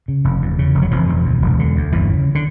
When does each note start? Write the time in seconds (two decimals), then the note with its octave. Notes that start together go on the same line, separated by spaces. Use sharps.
0.08 C#3
0.24 F1
0.42 E2
0.59 C#3
0.75 F1
0.82 F#3
0.91 E1 F2 F3
1.09 E1
1.25 D2
1.42 E1
1.59 D3
1.76 D2
1.92 G1 E2 E3
2.10 C#3
2.35 D3